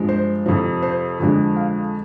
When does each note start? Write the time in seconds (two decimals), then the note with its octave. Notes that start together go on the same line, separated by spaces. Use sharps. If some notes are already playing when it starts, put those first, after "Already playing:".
Already playing: G2 F3 G#3
0.09 C5
0.46 F2 C3 F3
0.82 C5
1.20 F2 D3 F3 G#3
1.56 F5